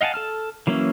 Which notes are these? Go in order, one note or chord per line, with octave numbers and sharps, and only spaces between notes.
D#5 F5 F#5 G#5 A5
A4 A5 F6
E3 F#3 A#3 C#4 E4